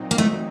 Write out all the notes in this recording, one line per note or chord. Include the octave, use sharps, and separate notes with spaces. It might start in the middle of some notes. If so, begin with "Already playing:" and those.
Already playing: A#2 F#3 C4 D#4
A#3
A3